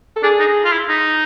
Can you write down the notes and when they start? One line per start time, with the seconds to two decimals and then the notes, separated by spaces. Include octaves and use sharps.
0.16 A4
0.23 D4 G#4
0.40 D#4
0.65 F4
0.72 E4
0.89 D#4